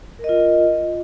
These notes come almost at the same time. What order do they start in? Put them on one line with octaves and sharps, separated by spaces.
A#4 D#5 F4